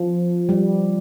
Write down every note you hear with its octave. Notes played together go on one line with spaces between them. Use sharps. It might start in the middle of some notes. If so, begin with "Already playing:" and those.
Already playing: F3
G3